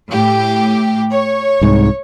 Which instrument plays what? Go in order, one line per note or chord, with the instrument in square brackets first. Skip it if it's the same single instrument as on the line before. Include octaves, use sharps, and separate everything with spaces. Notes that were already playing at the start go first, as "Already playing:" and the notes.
[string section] A2 G4
C#5
[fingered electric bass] C2 G#2